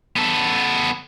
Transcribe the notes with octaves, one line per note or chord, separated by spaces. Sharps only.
B3 A4